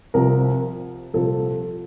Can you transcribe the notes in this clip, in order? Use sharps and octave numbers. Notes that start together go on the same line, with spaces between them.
C2 C3 F3 A#4
C2 A#2 F3 A4